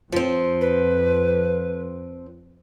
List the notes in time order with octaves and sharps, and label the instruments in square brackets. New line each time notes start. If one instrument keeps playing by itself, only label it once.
[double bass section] F2 [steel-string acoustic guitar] F3 C4
[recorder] B4